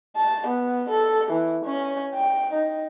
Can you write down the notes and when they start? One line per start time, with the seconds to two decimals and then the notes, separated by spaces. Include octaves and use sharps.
0.16 A5
0.47 B3
0.90 A4
1.31 E3
1.65 C#4
2.14 G5
2.53 D#4